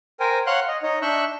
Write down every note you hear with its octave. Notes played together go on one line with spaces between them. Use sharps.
A#4 C5 G5 G#5
C#5 F5 F#5 C6 F#6
D#5
D#4 C#5 D#5
D4 E5 C#6 E6 F#6 G6